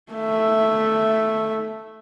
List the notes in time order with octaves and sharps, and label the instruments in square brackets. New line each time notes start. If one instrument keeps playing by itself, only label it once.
[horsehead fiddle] A3 E5